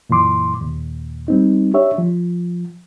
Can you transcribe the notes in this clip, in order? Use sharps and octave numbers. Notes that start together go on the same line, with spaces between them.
F#2 A#2 E3 C6 D6
D#2 A#2
G3 C4 D#4
D4 G4 C#5 E5
F3